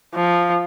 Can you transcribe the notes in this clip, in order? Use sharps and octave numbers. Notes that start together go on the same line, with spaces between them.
F3